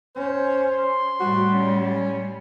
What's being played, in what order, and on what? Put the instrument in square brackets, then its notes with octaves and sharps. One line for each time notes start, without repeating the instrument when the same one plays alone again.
[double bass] C#4 [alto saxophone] C5
[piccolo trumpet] C6
[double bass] A2 [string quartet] G3 [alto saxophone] F#4
[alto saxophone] C#4